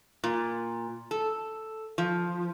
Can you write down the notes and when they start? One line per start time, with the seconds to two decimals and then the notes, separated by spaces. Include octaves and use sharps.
0.24 A#2
1.11 A4
1.98 F3